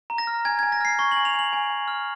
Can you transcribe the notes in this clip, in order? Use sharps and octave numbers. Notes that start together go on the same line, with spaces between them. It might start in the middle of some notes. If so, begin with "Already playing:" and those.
A#5
A#6
F6
G#5 G#6
G#5 G#6
A#6
F6 C7
C#6 A#6
G#5 F#7
F7
G#5 F#7
G#5
G#5
F6